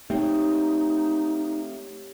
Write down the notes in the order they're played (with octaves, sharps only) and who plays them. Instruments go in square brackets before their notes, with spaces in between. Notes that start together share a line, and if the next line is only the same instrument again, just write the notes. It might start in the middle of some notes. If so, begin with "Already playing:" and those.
[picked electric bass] A3 C4 [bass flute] D#4 [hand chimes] G4 C#5